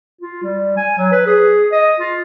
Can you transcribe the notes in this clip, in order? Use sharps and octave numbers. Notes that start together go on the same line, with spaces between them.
F4
G3
G#5
F#3
B4
G#4
D#5
F4